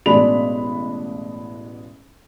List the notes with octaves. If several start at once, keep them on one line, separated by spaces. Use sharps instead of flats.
A1 B2 G#3 D4 B5 F7